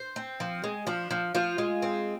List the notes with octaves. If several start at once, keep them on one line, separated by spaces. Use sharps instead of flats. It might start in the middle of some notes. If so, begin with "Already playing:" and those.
Already playing: C5
C4
F3
G#3
F3 D4
F3
F3 F4
G#3
C4